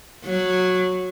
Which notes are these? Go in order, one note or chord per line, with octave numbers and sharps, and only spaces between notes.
F#3